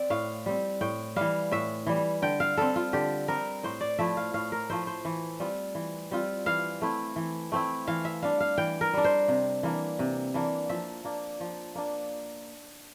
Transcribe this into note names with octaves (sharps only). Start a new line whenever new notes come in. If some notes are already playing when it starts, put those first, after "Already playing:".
Already playing: C4 D5
A2 F5
G3 C4
A2 G5
E3 G3 F5
A2 E5
E3 G3
D3 G5
F5
G3 C4 A4
F4
D3 G4
G3 C4 A#4
A2 C5
D5
F3 A3 E4 E5
F5
A2 F5
A#4
F3 A3 E4 C5
C5
E3
G3 C4 F4
E3
G3 C4 F4
E3 F5
A3 C4 E4
E3
A3 C4 E4
E3 F5
E5
G3 D4 F5
F5
E3 G5
A#4
G3 D4
C5
C3
E3 A#3 D4
C3
E3 A#3 D4
F3 E5
A#3 D4
F3
A#3 D4